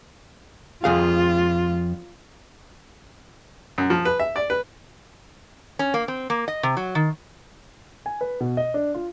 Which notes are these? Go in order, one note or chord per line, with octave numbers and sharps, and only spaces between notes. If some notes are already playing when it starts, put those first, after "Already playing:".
F2 F4 G#4 F5
F#2
F3
B4
E5
D5
B4
C#4
A#3
C4
A#3
D#5
C3
F#3
D#3
G#5
B4
B2
D#5
D4
F4